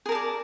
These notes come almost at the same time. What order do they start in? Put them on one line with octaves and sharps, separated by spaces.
G#4 A#4 A5 D5